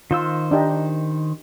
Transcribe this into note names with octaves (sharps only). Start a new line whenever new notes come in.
D#3 F4 C5 E6
D4 D#4 G4